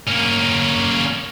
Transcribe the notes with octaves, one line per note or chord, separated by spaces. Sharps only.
A#3 C#4